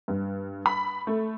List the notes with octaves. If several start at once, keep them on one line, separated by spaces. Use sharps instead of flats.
G2
B5
A3